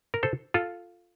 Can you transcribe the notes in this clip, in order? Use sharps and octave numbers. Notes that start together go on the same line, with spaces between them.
A#4
A4 C5
F4 A4